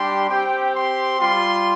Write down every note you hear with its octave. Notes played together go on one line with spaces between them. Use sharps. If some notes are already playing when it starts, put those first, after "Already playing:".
Already playing: G3 D4 G4 C6
C4 G4 G5
C6
G3 F4 C6